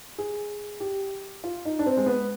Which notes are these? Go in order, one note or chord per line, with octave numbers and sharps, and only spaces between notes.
G#4
G4
F4
D#4
D4
C4
G#3
B3